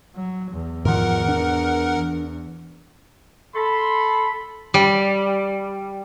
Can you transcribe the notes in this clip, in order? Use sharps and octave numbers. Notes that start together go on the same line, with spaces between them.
F#3
E2
G#2 D#3 F3 A#4 F#5
D4
A4 B5 C6
G3